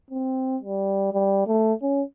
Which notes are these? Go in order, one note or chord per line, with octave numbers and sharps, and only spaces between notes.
C4
G3
G3
A3
C#4